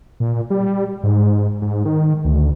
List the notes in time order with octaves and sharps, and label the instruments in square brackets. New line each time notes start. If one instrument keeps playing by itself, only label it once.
[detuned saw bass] A#2
G3
G#2
G#2
D#3
D2